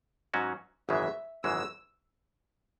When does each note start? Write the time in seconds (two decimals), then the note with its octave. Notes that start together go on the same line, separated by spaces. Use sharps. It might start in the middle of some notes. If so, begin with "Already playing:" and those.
0.34 G#2 F#3 C#4 F#4
0.89 G#1 F#2 C#3 E3 G#3 E5
1.44 G#1 F#2 C#3 E3 G#3 E6